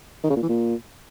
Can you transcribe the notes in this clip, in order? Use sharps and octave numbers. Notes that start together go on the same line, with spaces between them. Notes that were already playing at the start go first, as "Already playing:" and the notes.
D#3
C#3
A#2
E3
A#2